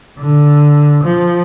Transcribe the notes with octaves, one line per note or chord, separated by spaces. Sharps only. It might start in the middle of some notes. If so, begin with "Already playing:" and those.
D3
F3